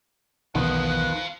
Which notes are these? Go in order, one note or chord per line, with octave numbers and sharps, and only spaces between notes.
B1 E2 D#3 B3 F4 A4 F#6